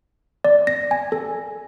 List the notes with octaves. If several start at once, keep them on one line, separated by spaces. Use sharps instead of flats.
D5
A#6
G#5
A4